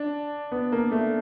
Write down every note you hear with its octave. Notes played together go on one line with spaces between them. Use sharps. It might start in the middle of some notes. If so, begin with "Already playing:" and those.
Already playing: D4
B3
A#3
A3